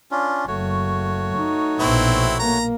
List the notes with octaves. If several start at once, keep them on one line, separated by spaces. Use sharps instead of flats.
C#4 D4 F4
F#1 A3 F#4 C#5
D#4
A#1 B2 C4 E4
A#3 A#5